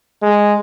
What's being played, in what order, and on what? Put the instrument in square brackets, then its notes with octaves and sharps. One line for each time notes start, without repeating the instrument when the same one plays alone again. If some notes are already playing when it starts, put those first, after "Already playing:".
[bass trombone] G#3